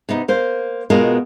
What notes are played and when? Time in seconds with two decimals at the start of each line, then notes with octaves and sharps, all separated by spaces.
0.09 C3 B3 D#4
0.28 A#3 C5
0.90 B2 G#3 A#3 B3 F4 A#4